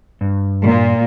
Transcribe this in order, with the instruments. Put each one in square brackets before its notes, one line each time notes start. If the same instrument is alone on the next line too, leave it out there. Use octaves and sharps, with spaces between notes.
[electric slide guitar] G2
[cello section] A#2